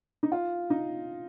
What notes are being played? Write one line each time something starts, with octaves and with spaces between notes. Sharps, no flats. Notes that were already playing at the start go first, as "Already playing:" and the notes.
D#4
F4
D#4